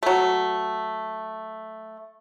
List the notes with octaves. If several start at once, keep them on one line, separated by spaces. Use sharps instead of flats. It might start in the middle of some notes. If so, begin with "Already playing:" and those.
F#3 A3